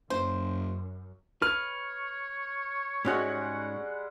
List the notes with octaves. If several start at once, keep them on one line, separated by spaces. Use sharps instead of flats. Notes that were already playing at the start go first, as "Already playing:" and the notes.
F#1 F#2 C5
B4 C#5 F6
G#2 G3 G#3 C#4 F#4 F#5